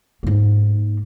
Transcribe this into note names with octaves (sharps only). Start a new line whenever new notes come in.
G#2 A#3